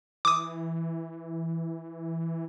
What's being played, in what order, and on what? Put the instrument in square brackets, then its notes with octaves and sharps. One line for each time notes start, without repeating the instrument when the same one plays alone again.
[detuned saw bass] E3 [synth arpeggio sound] D6 D#6